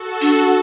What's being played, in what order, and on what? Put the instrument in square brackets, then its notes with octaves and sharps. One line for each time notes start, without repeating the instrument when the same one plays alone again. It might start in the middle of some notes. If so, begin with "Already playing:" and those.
Already playing: [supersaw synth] F#4 A4
[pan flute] D4